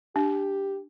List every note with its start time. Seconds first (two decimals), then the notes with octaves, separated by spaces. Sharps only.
0.16 D4 G4